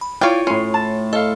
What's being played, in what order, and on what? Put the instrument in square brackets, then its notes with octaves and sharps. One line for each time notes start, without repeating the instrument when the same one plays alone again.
[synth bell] B5
[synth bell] E4 F4 [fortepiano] C#5 G5 [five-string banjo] D5 F5
[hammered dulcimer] A2 C6 [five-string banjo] C#4
[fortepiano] A5
[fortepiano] A4 F5 [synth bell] D#5